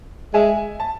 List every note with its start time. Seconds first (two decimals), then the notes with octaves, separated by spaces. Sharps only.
0.34 G#3 E5 G#5
0.80 A5